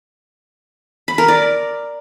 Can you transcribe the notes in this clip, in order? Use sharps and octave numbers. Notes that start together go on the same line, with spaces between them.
B5
A#4
D5